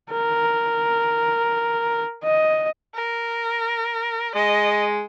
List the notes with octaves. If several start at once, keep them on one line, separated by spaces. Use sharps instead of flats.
A#4
D#5
A#4
G#3 D#5